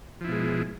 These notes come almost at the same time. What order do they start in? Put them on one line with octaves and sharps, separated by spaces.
F3 E4 B2 G#3